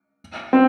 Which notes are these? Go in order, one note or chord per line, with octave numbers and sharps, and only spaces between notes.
C4